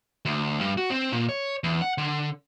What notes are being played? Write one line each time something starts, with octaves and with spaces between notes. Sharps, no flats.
D2
G2
F#4
C4
A#2
C#5
E2
F#5
D3